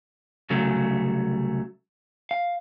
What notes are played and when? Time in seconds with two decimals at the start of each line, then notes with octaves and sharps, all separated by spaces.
0.50 C2 C#3 F#3 A3
2.31 F5